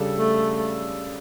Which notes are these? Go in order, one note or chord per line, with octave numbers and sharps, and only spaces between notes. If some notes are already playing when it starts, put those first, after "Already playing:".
Already playing: C#3 G3 D4 A4
A3